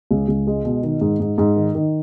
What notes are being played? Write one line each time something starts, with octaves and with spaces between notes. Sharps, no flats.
C#2
C#2
G#3
B2
D#3
G#2
G#2
G#2
D#3
D#3